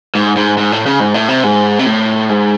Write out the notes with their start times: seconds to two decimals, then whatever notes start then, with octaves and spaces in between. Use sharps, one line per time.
0.15 G#2
0.37 G#2
0.58 G#2
0.72 A2
0.86 C#3
1.00 G#2
1.14 A2
1.28 C3
1.44 G#2
1.79 C3
1.86 A2
2.29 G#2